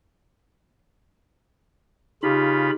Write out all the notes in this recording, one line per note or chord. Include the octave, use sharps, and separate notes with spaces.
C#3 D#4 F4 G4 B5